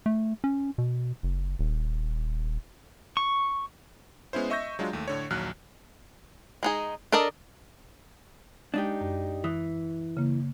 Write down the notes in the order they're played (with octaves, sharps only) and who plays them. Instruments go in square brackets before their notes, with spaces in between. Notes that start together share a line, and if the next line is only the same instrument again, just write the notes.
[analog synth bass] A3
C#4
B2
F#1
D#1
[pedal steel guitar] C#6
[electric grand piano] G#3 B3 C#4 E4 C5
D#5 E5 C#6 E6 G6 A#6
F#3 G#3 D4 F4
D#2 A3
A2 D3 C#5
A#1 D#2 F#3 F6 F#6
[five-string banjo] G#3 D#4 G#4
D4 A4 A#4 D5 D#5
[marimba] G#3 [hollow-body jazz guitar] D4 D#4 G4
[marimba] F#2
[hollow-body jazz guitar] E3 [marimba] D#6
[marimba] C#3 A#3